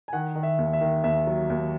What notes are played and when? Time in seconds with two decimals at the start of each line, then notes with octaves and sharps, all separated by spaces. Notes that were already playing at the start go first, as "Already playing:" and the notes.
0.08 G#5
0.13 D#3 F#5
0.35 D#3
0.43 E5
0.58 D#2
0.73 E5
0.81 D#3
1.04 D#2 E5
1.27 F#3
1.50 D#2